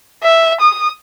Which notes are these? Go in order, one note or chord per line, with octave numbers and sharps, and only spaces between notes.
E5
D#6